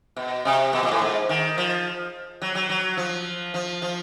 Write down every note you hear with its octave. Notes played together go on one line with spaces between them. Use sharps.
B2
C3
B2
A#2
A2
G#2
D#3
F3
F#3
F#3
F#3
F3
F3
F3